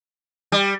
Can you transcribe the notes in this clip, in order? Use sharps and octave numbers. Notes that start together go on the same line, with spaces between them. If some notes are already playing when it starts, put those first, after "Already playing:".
G3